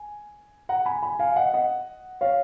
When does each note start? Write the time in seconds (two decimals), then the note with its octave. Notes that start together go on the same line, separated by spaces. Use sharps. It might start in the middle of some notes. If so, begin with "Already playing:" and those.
Already playing: G#5
0.69 F#5 A#5
0.86 G#5 B5
1.03 G#5 B5
1.19 F5 G#5
1.36 D#5 F#5
1.54 D#5 F#5
2.21 C#5 F5